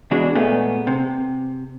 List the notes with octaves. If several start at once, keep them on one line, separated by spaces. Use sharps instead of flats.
B2 E3 G#3 D4 F#4
A#2 G#3 A3 B3
C3